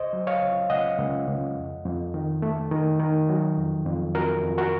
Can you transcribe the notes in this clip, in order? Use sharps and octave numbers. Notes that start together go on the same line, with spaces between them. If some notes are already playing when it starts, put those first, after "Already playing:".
Already playing: C#2 C5 D#5
F#3
C#5 F5
C#2
C#2 D#5 F#5
C#2
C#2
F2
F2
D#3
A3
D#3
D#3
F#3
F2
F2
F2 F#4 A#4
F2
F#4 A#4